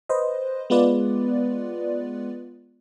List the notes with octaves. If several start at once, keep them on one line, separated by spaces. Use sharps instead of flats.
B4 C5 D#5
G#3 B3 F4 B4 D5